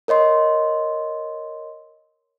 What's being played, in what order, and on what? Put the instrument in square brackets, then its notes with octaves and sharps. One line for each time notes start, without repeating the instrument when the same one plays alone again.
[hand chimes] A#4 C#5 D#5 C6